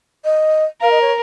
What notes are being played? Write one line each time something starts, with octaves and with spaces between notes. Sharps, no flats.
D#5
A#4 F5
D#5
C#5